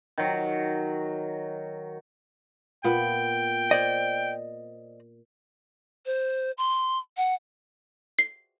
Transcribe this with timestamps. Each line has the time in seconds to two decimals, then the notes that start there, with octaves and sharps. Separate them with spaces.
0.18 D#3 F#3
2.84 A#2 B3 G5
3.71 C5 D5 D#5
6.06 C5
6.58 C6
7.17 F#5
8.19 C7